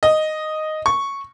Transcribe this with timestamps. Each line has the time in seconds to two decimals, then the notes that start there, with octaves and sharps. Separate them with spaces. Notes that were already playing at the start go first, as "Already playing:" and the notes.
0.03 D#5
0.86 C#6